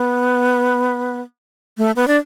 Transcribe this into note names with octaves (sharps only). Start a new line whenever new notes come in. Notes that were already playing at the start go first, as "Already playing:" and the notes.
Already playing: B3
A3
B3
D4